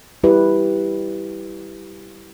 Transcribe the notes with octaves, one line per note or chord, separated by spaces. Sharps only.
G3 E4 G4 B4